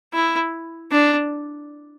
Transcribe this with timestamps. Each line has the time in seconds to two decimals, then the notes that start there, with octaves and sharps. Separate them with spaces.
0.13 E4
0.92 D4